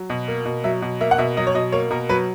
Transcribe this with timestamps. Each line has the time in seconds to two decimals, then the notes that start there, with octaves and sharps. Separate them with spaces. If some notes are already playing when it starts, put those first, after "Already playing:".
Already playing: F#3
0.10 B2
0.28 A#3
0.45 B2
0.64 F#3 E5
0.82 B2
1.00 A#3 E5
1.11 F#5
1.18 B2 E5
1.37 F#3 D#5
1.47 C#5
1.54 B2 D#5
1.72 A#3 C#5
1.90 B2 A#4
2.09 F#3 B4